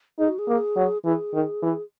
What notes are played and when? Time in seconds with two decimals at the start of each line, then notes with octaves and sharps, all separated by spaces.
0.19 D#4 G#4
0.29 F#4
0.39 G#4
0.48 A#3
0.76 F#3
1.05 E3 G#4
1.34 D#3
1.63 E3